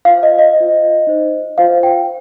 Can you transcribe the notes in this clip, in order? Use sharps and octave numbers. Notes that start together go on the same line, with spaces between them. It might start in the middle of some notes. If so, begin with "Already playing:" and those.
F4 C5 F5
D#5
D#5
F4 C5
D#4 C5
F4 C5 F5
G5